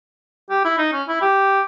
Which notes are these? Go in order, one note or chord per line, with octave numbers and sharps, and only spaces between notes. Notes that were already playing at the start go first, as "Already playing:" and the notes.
G4
E4
D#4
C#4
E4
G4